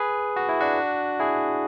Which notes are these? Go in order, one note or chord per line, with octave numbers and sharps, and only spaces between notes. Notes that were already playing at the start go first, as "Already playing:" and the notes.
Already playing: G#4 B4
F#4
E4
D4 F#4
E4 G#4